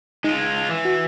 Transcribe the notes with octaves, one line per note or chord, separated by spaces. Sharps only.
G#3 D#4 F4
G#6
E3
F#4